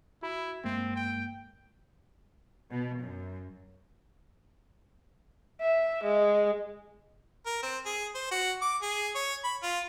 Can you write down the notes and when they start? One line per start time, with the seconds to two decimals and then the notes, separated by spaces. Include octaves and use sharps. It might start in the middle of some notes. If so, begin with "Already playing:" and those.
0.23 E4 F#4 B5
0.64 G2 G#3 A#3 C4
0.95 G5
2.71 B2
3.02 F#2
5.62 E5
6.03 G#3
7.46 A#4
7.63 C4
7.86 G#4
8.14 C5
8.31 F#4
8.61 D6
8.82 G#4
9.15 C#5
9.44 B5
9.63 F4